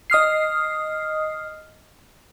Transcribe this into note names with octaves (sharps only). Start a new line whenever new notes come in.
D#5 D#6 F6 C7